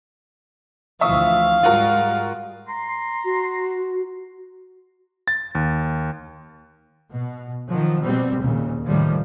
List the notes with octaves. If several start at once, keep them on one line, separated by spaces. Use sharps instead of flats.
D2 E3 F3 E5 F5 C#6 D#6
G#2 G3 G#3 F4 F#4 A#4
A#5 C6
F#4
A6
D#2
B2
D#3 F3 F#3
B2 G3 C4
D#2 A#2 C#3
A2 C3 D#3 F3 G3